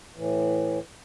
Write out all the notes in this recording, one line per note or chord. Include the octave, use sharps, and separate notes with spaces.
A2 E3